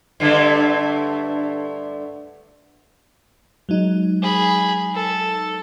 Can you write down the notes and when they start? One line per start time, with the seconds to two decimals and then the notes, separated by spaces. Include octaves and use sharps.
0.20 G2 D3 A3
3.69 F#3 G#3 D#4
4.22 G#4 B5
4.95 A4